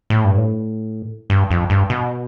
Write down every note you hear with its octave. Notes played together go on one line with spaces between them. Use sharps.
A2
G2
A2
G2
F2
G2
B2